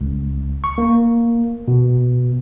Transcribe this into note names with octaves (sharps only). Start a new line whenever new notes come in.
C#2
C#6
A#3
B2